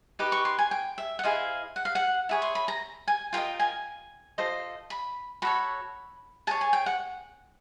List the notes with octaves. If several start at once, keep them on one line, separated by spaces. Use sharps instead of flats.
D#4 G4 B4 D6
C#6
C6
G#5
G5
E5
F#5
E4 G#4 C5 D#5 F5
F#5
F5
F#5
E4 G#4 C#5
C6
B5
A#5
G#5
F4 A#4 D#5 G5
G#5
F4 A4 C5 D#5
B5
F#4 A4 C#5 B5
G#4 C#5 A5
G#5
G5
F#5